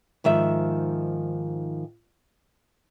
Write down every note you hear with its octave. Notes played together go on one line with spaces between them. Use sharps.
G#2 D#3 F3 E5